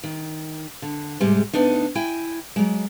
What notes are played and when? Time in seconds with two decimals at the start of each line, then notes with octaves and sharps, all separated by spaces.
0.04 D#3
0.82 D3
1.20 G#2 C3 G3 G#3
1.53 D2 B3 D4 D#4
1.95 E4 G5 G#5
2.56 F#3 G#3